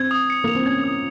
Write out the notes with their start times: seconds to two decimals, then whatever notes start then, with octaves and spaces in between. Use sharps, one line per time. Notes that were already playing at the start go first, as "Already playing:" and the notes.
Already playing: C4 G#6
0.11 D#6
0.30 C#7
0.44 A#3 F7
0.55 C4
0.66 C#4 G#6
0.84 D#6